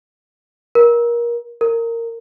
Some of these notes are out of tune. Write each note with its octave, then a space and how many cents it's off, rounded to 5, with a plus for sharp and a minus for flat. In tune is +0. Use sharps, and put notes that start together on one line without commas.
A#4 +25
A#4 -15